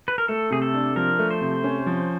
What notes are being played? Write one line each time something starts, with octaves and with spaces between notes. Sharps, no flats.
B4
A#4
A3 A4
C3 G#4
A4
D4
F3 A#4
A3
C5
C3
C#4
F3